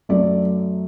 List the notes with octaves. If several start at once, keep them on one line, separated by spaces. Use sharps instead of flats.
F#2 F#3 A3 D5